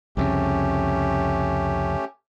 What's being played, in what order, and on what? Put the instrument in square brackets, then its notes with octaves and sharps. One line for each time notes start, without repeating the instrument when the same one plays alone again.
[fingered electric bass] C2 F2 C#3 [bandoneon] A3 C#4 G4